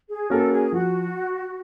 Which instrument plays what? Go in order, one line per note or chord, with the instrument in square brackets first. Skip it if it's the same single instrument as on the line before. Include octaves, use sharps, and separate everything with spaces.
[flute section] G#4
[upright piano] A#3 C#4 F#4 A#4 [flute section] A4
[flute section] G#4
[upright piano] F3 [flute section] F#4